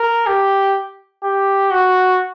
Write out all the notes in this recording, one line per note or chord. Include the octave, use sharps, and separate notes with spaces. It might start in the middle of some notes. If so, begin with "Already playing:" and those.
Already playing: A#4
G4
G4
F#4